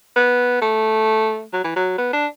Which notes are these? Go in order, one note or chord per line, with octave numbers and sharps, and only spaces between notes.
B3
A3
F#3
E3
F#3
B3
D4